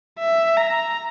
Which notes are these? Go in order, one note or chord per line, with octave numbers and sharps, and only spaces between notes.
E5
A#5